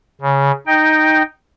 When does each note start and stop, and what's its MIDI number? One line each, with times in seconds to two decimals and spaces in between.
0.21 0.52 49
0.67 1.23 63
0.67 1.23 79